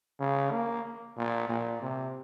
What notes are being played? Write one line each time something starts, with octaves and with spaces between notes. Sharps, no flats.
C#3
A#3
A#2
A#2
C3